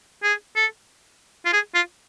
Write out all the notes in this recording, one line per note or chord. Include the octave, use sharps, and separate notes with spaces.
G#4
A4
F4
G#4
F4